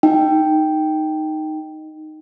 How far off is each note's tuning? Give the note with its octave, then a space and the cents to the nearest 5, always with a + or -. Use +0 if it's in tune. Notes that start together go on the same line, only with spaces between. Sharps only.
D#4 +0 G5 +0